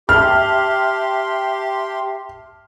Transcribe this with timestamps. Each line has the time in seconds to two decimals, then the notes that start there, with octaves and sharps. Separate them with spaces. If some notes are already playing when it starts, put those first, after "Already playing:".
0.09 G4 E5 A5 C6 F6